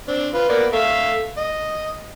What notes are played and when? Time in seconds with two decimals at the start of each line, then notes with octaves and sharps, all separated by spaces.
0.08 C4 D4
0.34 F4 B4
0.49 A#3 B3 D5
0.73 A3 E5 F5
1.37 D#5